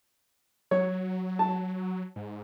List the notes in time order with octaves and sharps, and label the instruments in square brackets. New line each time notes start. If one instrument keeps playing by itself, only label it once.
[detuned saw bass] F#3 [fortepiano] C#5
[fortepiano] A5
[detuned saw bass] G#2